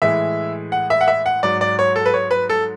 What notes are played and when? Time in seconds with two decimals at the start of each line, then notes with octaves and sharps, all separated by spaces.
0.02 A2 E3 G#3 E5
0.72 F#5
0.90 E5
1.01 F#5
1.08 E5
1.26 F#5
1.43 G#2 F#3 D5
1.61 D5
1.79 C#5
1.96 A4
2.06 B4
2.14 C#5
2.31 B4
2.49 A4